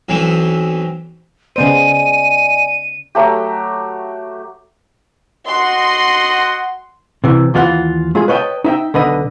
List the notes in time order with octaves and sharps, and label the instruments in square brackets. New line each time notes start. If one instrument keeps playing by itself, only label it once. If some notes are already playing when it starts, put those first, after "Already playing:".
[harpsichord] B1 E3 C4
[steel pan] C#3 B3 C5 [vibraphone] D5 D#5 G#5 [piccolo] D#7
[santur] F#3 A3 G4
[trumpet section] F#4 D#5 F#5 [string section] C6
[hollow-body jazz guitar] C3 E3
D#2 E3 F4 C5 F#5
G#3 F4 G#4
B4 C#5 D#5 F5 G5 A5
D#4 E5 G5
B1 D3 B4 D#5